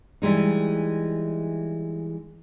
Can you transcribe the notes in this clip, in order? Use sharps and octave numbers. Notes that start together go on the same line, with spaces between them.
E3 G3 G#3 D#4